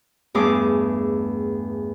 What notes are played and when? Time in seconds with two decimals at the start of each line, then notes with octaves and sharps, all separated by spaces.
0.35 E2 G2 A3 G#4 D6